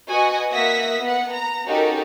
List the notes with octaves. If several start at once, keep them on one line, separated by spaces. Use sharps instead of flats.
F#4 B4 D#5 G#5 C#6 D#6
A#3 E5 F#5 D#6 A#6 B6
B3 F#5
A#5
C#4 D#4 F#4 G4 A4 A#4